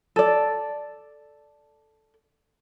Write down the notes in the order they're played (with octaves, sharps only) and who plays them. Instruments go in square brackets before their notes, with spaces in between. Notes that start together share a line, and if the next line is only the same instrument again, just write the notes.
[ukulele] A4 D5